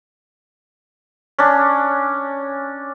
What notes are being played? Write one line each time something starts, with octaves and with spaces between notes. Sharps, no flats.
C#4 D4